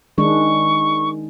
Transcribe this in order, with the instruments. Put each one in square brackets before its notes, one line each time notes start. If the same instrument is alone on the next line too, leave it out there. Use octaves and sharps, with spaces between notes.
[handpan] D#3 G#3 D4 [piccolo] C#6